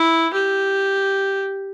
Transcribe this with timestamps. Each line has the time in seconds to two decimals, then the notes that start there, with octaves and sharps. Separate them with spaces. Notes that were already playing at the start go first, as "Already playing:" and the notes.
Already playing: E4
0.33 G4